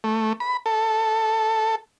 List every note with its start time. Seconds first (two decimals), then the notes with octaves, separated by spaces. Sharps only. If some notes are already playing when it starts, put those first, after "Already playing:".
0.04 A3
0.40 B5
0.66 A4